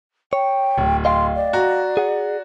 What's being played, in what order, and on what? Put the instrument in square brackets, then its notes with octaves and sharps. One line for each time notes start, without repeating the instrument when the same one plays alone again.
[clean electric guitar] C#5 [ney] G5
[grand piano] D1
[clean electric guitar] D#5 F5 G5 [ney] C6
[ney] D5
[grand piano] F#4 A#5
[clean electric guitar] G#4 F#5